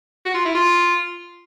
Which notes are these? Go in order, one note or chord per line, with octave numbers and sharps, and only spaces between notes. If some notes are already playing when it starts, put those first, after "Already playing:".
F#4
F4
E4
F4